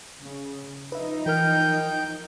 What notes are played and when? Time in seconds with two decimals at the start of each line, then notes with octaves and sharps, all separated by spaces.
0.21 C#3
0.92 F3 D#4 B4 E5
1.26 E3 A#4 G5 F6 G6